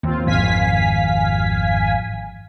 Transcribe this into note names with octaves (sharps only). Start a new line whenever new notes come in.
D#2 C4 F4
G#1 F2 D#3 F5 G#5 B6